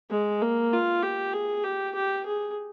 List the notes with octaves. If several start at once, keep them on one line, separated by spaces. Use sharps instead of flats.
G#3
A#3
F4
G4
G#4
G4
G4
G#4